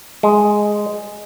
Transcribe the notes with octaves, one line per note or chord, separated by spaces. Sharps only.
G#3